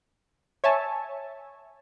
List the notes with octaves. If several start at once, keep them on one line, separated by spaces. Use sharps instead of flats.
C#5 E5 G#5 A5